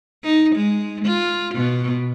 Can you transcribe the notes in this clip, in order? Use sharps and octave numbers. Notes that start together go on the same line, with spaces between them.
D#4
G#3
F4
B2